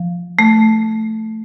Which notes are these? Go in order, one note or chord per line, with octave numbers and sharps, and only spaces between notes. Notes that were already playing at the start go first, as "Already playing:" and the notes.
Already playing: F3
A3